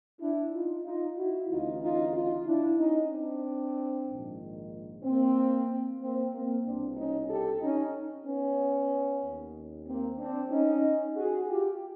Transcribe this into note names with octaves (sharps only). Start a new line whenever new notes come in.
D4 E4
D#4 F4
D#4 F4
E4 F#4
D2 C#3 E3 D#4 F4
D#4 F4
D#4 F4
D4 E4
C#4 D#4
C4 D4
A#1 G#2 D#3
A#3 C4
A#3 C4
A#3 C4
C2 B2 C4 D4
C#4 D#4
G4 A4
C#4 D#4
B3 C#4
D#2 D#3
A#3 C4
C4 D4
C#4 D#4
F#4 G#4
F4 G4